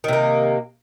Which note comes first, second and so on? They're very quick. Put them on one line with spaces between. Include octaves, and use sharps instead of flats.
D#3 C3 A#3